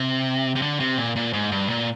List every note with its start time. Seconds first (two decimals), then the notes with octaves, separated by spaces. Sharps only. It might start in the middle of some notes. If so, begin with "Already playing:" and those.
Already playing: C3
0.56 C3
0.62 D3
0.80 C3
0.98 A#2
1.16 A#2
1.33 G#2
1.52 G2
1.69 A#2